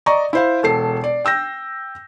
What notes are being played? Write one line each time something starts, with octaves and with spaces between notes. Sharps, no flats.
D5 D#5 A#5 C#6
E4 C5 F5
E1 A4 C7
D5
G5 E6 G6 A#6